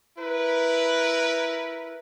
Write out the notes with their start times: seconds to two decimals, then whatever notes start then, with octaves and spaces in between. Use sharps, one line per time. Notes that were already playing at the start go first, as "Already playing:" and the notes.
0.19 E4 A#4 B4